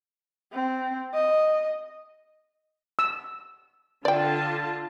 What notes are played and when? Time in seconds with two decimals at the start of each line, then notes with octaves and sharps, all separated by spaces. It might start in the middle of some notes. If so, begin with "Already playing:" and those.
0.53 C4
1.14 D#5
2.99 E6
4.05 D3 F4 D5 G5 A5